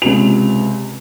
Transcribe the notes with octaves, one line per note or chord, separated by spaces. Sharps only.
C#2 C3 F7